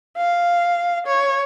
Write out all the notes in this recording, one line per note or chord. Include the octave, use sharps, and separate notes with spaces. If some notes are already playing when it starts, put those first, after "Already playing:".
F5
C#5